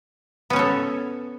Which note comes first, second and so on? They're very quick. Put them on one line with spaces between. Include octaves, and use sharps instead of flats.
B3 C#4 C#5 A4